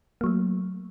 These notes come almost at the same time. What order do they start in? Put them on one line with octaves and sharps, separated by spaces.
A#3 F#3 A3